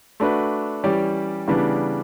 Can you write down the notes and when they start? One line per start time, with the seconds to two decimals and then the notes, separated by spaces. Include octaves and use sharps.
0.20 A3 D4 F#4 B4
0.84 E3 G3 C#4 G4 D5
1.48 C#3 E3 G3 B3 D4